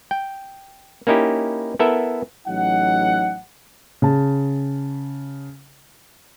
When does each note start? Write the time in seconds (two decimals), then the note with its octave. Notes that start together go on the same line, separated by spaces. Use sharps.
0.11 G5
1.07 A#3 C#4 D#4 E4 G4
1.79 B3 E4 A4 A#4 E5
2.48 A1 F#3 D#4 F#5
4.02 C#3 A5